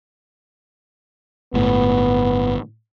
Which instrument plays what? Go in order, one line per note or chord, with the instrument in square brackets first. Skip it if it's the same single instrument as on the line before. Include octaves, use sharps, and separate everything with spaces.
[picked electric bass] G1 A2 [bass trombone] B3